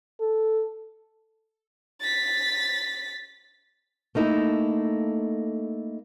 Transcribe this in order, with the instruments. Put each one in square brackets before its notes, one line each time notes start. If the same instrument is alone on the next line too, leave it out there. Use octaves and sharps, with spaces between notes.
[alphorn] A4
[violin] A6 B6
[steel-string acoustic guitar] A3 A#3 D#4 E4 A4